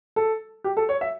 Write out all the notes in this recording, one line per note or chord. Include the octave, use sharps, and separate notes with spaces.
A4
G4
A4
C#5
E5